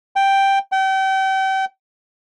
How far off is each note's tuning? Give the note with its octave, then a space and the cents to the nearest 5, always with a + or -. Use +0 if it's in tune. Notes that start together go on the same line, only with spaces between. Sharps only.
G5 +0
G5 -35